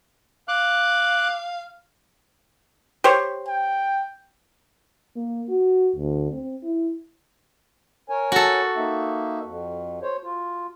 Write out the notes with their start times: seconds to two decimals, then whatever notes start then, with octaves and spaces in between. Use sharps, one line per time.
0.48 F5 D6 F#6
3.04 G4 C5 C#5
3.49 G5
5.16 A#3
5.49 F#4
5.96 D2
6.32 C4
6.63 E4
8.10 A#4 C#5 G#5
8.32 F#4 A4
8.76 A#3 D#4 E5
9.42 F2
10.02 C5 C#5
10.23 F4